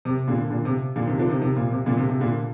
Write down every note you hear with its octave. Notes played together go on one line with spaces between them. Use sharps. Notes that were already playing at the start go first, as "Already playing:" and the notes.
C3
A#2 D3
A#2 D3
C3
A#2 D3
C3 D#3
D3 F3
C3 D#3
C3 D#3
A#2
C3
A#2 D3
C3
C3
A#2 D3